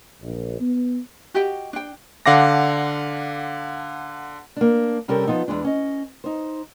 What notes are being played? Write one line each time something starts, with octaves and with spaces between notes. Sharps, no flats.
A#1
B3
F#4 G4 D#5 G5
D4 G5
D3 F5 F#5 D6 A#6
A#3 D4
C3 G3 C#4 G4 A4 A#4
F3 B3 D#4
E2 G2 G#3 D4
C#4 D#5
D#4 C5